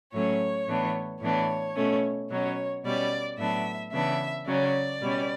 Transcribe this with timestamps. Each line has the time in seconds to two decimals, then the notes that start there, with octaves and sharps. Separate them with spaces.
0.13 A2 F#3 A3 C#4 C#5
0.67 A2 E3 B3 D4
1.21 A2 E3 B3 D4 C#5
1.75 B2 A3 C#4
2.29 B2 F#3 C#4 C#5
2.83 B2 G3 C#4 D5
3.38 A2 F#3 B3 D4 E5
3.92 C#3 E3 B3 D4 E5
4.46 C#3 F#3 C#4 D5
5.01 B2 G3 C#4